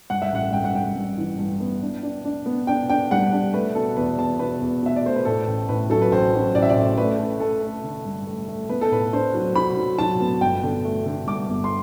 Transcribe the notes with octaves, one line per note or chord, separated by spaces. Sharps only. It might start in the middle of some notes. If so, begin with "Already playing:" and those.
G2 F#5
E5
A1 F#5
G2 G5
F#5
G2 G5
G2
E3
G2
B3
D4
D4
D4
B3
D4 G5
D4 G5
G3 F#5
D4
A3 B4
B2 A4
E2 B4
E2 A5
B2 B4
E2
B2 E5
D5
A3 C5
B4
A2 A4
A1
A2 B4
F#3 A4
B4
A1 C5
F#3
A1 D5
E5
D5
A2
A3 B4
A3
A3 A4
A3
D3
G2
A3
A3
B3 B4
A4
A2 B4
D4 C5
F#3
F#3 B5
F#3
F#3 A5
B3
G1 G5
D3
A3
D3
G2 D6
G1
C6